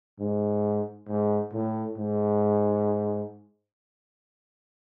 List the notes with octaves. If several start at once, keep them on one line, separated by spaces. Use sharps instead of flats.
G#2
G#2
A2
G#2